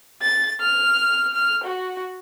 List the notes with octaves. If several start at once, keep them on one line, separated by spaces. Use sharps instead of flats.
A6
F6
F6
F#4